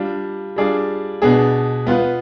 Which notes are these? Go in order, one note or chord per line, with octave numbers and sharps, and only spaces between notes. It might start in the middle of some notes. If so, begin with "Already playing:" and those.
Already playing: G3 D4 F4
G3 D4 F4 G#4 D5
B2 B3 D4 G#4
B3 F4 B4